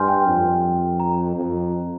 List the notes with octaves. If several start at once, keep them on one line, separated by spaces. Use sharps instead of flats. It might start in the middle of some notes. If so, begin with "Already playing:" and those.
Already playing: G2 G#5 C6 F6 G6
G5
F2
A#5
F2